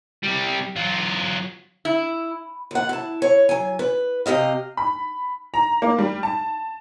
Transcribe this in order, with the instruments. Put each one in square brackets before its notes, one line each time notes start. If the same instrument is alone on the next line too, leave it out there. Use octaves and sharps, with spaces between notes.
[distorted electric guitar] C3 G3
F#3 F4
[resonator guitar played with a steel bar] E4
[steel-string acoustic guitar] D#2 F#5
E4 A5
C#5
F#3 G#5
B4
C3 G4 D#5 F5
[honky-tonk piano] B5
A#5
A#3
G3
A5